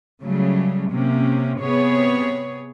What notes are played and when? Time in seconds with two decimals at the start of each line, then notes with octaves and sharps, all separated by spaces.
0.23 C#3 F#3 G3 A3
0.91 C3 A#3 C#4
1.60 C3 B3 G#4 C#5